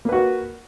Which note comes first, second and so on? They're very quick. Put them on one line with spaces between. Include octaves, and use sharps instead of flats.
A#3 B4 F#4